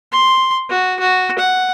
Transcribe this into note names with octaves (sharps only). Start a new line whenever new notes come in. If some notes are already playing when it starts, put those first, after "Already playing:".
C6
F#4
F#4
F#5